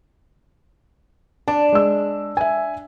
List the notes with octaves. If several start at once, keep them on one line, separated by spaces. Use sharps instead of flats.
D4 A5
G#3 E6
E5 G#5